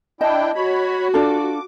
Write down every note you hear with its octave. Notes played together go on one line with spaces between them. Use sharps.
D4 E4 D#5 G5 A5
F#4 C#5 B5
D4 F4 A4 D6